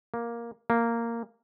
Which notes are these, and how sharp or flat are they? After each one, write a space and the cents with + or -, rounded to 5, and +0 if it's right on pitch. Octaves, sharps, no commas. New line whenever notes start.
A#3 +5
A#3 -10